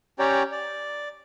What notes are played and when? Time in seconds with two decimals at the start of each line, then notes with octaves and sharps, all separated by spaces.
0.19 C#4 G4 C#5 D5 G5 A#5
0.52 D5